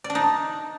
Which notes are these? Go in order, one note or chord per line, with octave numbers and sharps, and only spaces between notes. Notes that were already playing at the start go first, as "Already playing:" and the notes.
D5
D4
D#4